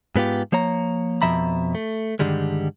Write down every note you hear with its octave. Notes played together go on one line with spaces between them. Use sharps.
G#2 B3 F4 G4
F3 A#3 C#5 A#5
F2 B2 F3 E5 A#5 B5
A3
G2 D3 D#3 G3 G#3